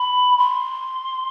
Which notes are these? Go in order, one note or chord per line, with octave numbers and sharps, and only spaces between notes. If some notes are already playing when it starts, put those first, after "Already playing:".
Already playing: B5
C6